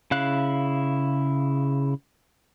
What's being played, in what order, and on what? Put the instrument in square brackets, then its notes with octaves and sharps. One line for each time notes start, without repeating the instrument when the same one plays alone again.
[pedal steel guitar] C#3 E4 F5 F#6